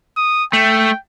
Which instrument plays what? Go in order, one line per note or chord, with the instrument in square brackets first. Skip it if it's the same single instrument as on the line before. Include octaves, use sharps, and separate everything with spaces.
[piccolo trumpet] D#6
[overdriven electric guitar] A3 [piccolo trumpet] G5